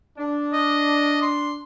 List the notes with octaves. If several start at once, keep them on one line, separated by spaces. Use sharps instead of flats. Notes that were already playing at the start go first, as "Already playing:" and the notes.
D4
D#5
C6